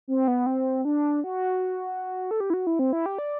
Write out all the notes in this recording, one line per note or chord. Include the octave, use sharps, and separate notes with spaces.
C4
B3
C4
D4
F#4
A4
G4
E4
F#4
E4
C4
E4
G4
D5